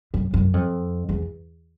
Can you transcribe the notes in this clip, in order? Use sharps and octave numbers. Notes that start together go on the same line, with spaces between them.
F#2
F#2
F2
E2